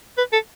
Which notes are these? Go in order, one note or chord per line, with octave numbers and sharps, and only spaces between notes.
B4
A4